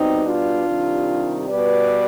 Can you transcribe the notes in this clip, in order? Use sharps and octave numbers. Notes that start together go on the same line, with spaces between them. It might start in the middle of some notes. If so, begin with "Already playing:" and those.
Already playing: B2 G3 C4 D#4
D4 F4
C3 D#3 G3
B2 G3 B4 D5